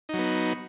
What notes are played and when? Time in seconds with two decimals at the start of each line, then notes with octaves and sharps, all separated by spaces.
0.09 D#4
0.14 F#3
0.18 B3